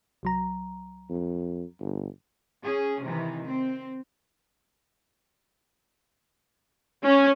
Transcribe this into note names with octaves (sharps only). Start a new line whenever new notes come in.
C2 F#3 A#5
F2
G1
C#4 G#4
C3 D#3 E3
C4
C#4